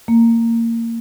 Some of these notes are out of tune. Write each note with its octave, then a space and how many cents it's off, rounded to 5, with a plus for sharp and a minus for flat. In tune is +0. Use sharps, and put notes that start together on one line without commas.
A#3 -20